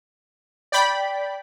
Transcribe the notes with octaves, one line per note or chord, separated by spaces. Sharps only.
D5 G5 B5